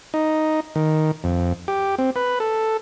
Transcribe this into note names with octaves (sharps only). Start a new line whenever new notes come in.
D#4
D#3
F2
G4
C4
B4
A4